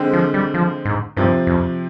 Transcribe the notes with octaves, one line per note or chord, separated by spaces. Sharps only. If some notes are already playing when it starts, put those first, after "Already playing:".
Already playing: D3 G#3 C4
F3
G3
F3
G#2
G2 C3 F3 C4
F2